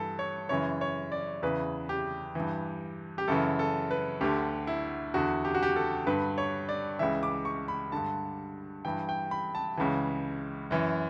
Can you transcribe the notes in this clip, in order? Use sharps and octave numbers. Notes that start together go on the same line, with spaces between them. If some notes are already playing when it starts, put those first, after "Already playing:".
Already playing: G2 E3 A4
C#5
F#2 C#3 E3 C#5
C#5
D5
E2 C#3 E3 B4
G4
G2 E3
G4
F#2 C#3 E3 A4
A4
B4
D2 D3 G4
E4
E2 D3 F#4
G4
F#4
G4
A4
G2 D3 B4
C#5
D5
C#2 C#3 E3 E5
D6
C#6
B5
G2 D3 A5
G2 E3 G5
G5
B5
A5
C#2 C#3 E3
F#2 E3